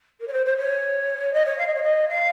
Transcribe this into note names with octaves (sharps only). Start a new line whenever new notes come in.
A#4
C#5
C5
C5
C#5
D#5
C#5
F5
D#5
C#5
D#5
F5